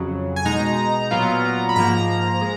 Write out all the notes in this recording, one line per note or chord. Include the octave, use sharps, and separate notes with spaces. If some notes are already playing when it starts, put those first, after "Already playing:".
Already playing: F2 C#3 F#3
G#5
B2 G#3 D#4 A#5
A#2 F#3 B3 F4
B5
G#2 F3 A#3 A#5
G#3